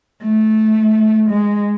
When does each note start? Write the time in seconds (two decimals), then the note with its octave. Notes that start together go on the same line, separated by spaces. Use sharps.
0.23 A3
1.30 G#3